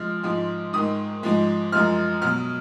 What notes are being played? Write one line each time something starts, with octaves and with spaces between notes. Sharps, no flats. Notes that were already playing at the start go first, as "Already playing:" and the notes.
Already playing: F3 G#3 F6
G#2 F3 G#3
G#2 D#3 G#3 D#6
G#2 F3 G#3
F#2 F3 G#3 F6
B2 F#3 F6